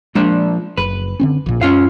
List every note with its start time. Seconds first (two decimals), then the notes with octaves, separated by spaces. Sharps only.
0.15 A#2 F3 G#3 D4
0.77 F#1 B4
1.20 D3 C4 C#4
1.46 A#1 A#2
1.61 F#2 C#4 F4 F5